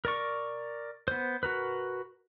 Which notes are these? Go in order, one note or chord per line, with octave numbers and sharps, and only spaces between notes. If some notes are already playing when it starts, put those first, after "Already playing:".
A#4 D5 C#6
B3 C5
F#4 A#4 B4